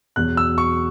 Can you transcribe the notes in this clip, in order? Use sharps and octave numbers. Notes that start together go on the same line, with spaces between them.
E2 B2 F#3 F#6
E6
C#6